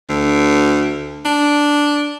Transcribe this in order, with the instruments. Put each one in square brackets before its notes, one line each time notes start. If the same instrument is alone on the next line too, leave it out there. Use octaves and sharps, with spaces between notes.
[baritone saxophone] D2
D4